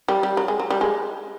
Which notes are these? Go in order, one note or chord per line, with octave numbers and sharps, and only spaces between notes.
G3
G3
F#3
G#3
F#3
G3
G#3